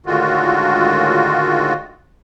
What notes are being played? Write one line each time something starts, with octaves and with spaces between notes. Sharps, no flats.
A2 D3 D#3 G#3 F4 F#4